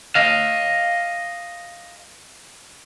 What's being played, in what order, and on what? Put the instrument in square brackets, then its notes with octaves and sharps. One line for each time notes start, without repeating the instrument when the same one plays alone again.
[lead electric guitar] D#5 F5